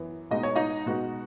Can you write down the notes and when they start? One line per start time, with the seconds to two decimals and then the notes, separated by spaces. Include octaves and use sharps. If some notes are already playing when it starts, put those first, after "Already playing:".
Already playing: F#2 E3 B3
0.31 B2 G#3 D#4 D#5
0.43 C#5
0.56 D#4 D#5
0.86 B2 G#3 D#4 F#4